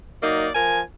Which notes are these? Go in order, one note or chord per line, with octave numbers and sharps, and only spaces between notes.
F#3 A#3 D#4 D5
F3 A#4 G#5